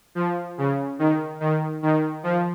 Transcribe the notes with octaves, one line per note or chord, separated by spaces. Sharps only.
F3
C#3
D#3
D#3
D#3
F3